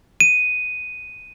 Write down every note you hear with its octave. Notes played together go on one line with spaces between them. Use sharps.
D#7